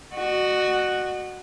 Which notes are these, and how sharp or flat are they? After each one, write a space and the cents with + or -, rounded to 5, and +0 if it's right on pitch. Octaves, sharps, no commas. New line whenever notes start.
F#4 +0 D#5 -45